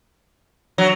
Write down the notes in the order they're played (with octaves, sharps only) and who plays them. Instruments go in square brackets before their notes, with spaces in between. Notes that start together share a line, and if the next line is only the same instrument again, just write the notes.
[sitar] F#3